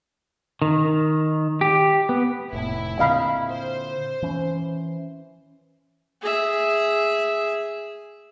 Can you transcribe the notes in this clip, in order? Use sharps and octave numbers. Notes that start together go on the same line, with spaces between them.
D#3
G4
B3
F1 A2 E4
A#2 D3 C4 D#5 F5 B5
C5
E3 C#4
G#4 E5